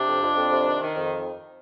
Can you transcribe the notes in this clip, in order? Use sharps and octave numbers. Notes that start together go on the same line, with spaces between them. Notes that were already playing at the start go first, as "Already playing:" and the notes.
Already playing: C3 D4
F2
F2
F2
C3
D#3
D#3
F2